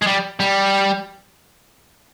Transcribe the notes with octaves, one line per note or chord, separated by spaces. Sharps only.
G#3
G3
G3